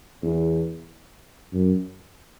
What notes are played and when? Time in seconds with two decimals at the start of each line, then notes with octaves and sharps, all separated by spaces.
0.23 E2
1.53 F#2